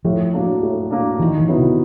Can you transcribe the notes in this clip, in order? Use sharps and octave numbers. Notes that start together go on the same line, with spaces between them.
A2 F3
F#3 A#3 D4
A2
F#3 A#3 D4
D#3 E3
E3
F#3 B3 E4
C3